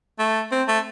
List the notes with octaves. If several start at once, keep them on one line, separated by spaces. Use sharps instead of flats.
A3
C4
A3